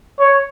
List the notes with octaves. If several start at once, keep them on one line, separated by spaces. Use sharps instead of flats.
C#5